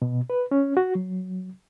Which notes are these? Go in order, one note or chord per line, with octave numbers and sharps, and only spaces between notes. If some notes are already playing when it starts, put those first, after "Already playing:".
B2
B4
C#4
F#4
F#3